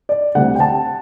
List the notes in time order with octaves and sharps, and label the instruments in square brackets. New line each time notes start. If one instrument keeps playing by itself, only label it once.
[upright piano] D5
D2 C3 G3 C4 F#5
G5
A5